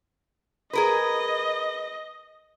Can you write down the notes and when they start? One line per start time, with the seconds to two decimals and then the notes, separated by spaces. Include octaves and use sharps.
0.73 G#4 A#4 B4 D#5